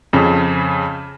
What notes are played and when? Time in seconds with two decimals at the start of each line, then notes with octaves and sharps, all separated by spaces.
0.13 F2 C#3